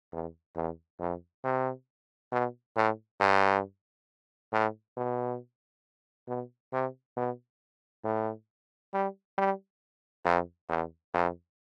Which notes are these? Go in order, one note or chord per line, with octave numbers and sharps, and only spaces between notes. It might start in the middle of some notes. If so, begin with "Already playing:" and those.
E2
E2
F2
C3
B2
A2
G2
A2
B2
B2
C3
B2
A2
G3
G3
F2
E2
F2